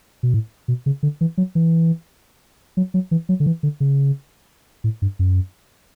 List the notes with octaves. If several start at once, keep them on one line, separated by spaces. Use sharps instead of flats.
B2
A2
B2
C#3
D3
E3
F#3
E3
F#3
F#3
E3
F#3
D3
E3
D3
C#3
A2
G2
F#2